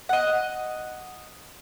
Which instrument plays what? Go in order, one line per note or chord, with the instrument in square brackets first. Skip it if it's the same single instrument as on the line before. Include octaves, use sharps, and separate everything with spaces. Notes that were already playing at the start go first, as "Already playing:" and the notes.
[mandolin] D#5 F#5